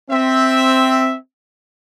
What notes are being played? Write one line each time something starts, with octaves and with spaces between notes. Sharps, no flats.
C4 E5